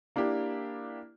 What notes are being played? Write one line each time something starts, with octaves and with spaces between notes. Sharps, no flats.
A#3 D4 E4 G4